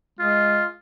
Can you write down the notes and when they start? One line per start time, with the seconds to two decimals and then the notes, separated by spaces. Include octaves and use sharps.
0.19 G#3 F4